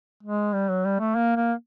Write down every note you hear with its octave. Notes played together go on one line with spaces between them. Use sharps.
G#3
G3
F#3
G3
A3
A#3
A#3